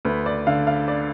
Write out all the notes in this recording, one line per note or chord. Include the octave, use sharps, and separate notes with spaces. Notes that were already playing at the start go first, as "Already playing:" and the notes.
D2 B4
D5
D3 F5
F5
D5